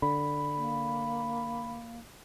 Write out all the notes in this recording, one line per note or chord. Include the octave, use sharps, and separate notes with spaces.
D3 B5
A#3